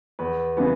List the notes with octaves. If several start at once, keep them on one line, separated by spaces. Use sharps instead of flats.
E2 B4
C#3 E3 G3 B3 B4